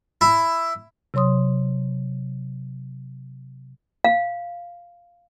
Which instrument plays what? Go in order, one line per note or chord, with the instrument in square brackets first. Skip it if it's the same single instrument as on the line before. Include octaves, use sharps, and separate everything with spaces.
[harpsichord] E4
[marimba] C3 F#3 C#5 C6 D#6
[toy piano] F5